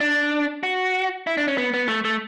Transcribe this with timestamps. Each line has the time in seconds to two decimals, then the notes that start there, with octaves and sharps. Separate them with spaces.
0.01 D4
0.63 F#4
1.27 E4
1.37 D4
1.48 C#4
1.58 B3
1.74 B3
1.88 A3
2.05 A3